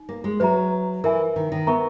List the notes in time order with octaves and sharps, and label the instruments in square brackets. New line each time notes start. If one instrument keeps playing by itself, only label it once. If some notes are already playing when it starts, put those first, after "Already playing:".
Already playing: [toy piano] D#4
[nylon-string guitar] A#3
G#3
[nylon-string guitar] F#3 [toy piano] B4 E5 A#5
[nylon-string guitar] E3 [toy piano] A#4 E5 G#5
[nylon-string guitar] D#3
D#3
[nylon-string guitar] B3 [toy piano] A#4 E5 A#5 C#6